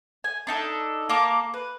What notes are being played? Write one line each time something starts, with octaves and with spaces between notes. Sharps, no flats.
G#5
D4 D#4 A4
A#3 A#4 A5 D6
B4